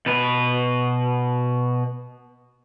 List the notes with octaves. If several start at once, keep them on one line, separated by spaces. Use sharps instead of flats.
B2 B4